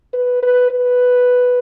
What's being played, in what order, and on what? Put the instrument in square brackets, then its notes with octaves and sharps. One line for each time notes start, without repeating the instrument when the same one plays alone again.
[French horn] B4
B4
B4